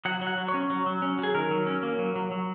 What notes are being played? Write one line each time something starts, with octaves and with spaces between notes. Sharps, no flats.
F#3 F#5
F#3
F#5
F#3
C#5
C#4
F#3
F#3
C#4
F#3
G#4
D#3 A#4
F#3
C#4
A#3
F#3
F#3
F#3